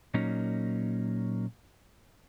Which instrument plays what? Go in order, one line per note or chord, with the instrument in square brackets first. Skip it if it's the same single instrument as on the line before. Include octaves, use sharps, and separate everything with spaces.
[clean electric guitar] A#2 F#3 A#3 C#4 D#4